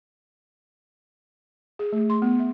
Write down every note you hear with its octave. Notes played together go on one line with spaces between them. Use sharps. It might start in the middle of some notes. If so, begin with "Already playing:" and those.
G#4
A3
C6
B3
E5